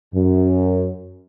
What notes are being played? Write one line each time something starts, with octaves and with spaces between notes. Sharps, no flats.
F#2